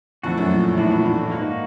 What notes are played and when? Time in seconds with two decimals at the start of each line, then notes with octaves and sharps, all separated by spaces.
0.23 F2 E3 A3 D4 F#4
0.38 F#2
0.51 A#2
0.78 A2 E3 A3 D4 F#4
0.91 A#2
1.05 A2
1.32 G#2 A#3 D#4 F#4